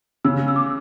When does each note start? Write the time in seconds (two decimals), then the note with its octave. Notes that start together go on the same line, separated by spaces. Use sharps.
0.25 C#3 E6
0.48 E6
0.56 D6
0.63 E6